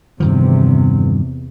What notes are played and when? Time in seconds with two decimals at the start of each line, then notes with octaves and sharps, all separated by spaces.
0.20 E2 G2 C3 D#3 F3